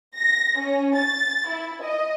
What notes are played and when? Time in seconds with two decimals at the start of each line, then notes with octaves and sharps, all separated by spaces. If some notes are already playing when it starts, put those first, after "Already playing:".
0.16 A#6
0.58 C#4
0.96 A6
1.48 E4
1.83 D#5